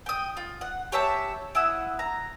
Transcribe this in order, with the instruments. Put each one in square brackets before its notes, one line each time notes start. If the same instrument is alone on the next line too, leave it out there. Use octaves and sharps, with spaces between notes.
[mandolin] G5 D#6
F4
F#5
G4 C#5 E5 A5
E4 F#5 D#6 E6
A#5